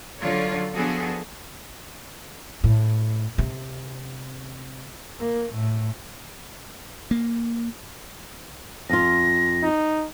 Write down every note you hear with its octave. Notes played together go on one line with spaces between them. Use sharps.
D3 F#3 F4 C#5 D5
F3 B3 D4 F#4 G#4 A4
A2
C3
A#3
A2
A#3
F2 F4 A#6
D#4